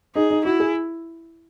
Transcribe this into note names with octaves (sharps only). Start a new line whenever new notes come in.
D#4 G#4
D#4
E4 F#4
G#4